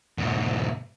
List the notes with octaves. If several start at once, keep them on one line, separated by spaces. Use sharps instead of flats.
G#2 B2